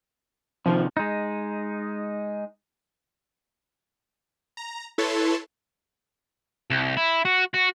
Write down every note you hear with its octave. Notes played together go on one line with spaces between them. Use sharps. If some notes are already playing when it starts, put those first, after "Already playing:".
C3 D#3 F3
G#3 D#4
A#5
E4 A4 B4 C#5 A5 C6
C2
E4
F#4
F#4